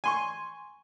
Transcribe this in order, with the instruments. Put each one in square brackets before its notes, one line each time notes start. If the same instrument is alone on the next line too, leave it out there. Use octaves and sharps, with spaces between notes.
[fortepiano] G#5 C6 C#6